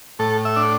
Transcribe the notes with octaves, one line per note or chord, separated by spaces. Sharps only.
A2 A4
E5
D4